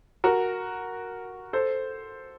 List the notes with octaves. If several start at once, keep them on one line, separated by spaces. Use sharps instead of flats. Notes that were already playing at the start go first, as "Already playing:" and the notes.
F#4 A#4
A4 C5